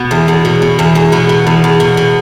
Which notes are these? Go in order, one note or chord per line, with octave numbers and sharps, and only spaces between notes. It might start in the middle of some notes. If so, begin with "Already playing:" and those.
Already playing: B2 B3
E2
E2
B2
B2
E2
E2
B2 B3
B2
E2
E2
B2
B2